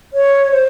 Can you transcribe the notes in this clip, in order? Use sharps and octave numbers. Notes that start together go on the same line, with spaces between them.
C#5
C5